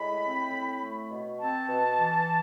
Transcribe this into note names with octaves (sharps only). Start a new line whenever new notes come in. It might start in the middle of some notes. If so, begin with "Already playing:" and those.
Already playing: A2 G#3 B5
C4
A2
A3
B2
C4 A5
B2
E3